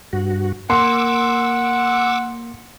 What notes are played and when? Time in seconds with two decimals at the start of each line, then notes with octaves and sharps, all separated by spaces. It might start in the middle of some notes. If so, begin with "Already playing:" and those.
0.13 G2 F#4
0.70 A#3 F#5 C6 D6 E6